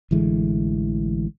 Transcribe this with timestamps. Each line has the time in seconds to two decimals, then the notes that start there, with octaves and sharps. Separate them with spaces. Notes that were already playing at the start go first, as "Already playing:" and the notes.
0.11 A1 D3 E3 G#3